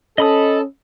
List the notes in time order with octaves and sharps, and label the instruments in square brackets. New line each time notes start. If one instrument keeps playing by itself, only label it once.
[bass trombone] C#4 [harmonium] A4 [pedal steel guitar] D#5 B5 D#6